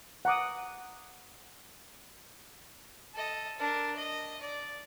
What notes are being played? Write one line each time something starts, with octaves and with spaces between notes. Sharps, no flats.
F#5 A#5 D6 D#6
A4 D#5
D4 A#4
D#5
D5